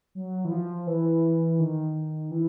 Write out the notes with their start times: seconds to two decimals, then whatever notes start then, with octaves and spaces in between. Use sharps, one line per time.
0.15 F#3
0.45 E3
0.51 F3
0.87 E3
1.60 D#3
2.31 E3